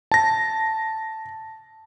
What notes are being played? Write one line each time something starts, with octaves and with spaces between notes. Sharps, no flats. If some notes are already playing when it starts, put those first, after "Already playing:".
A5 A#6